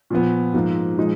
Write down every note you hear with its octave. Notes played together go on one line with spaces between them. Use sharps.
A#2 F3 B3
G#2 F3 A#3
A#2 F3 G#3 D#4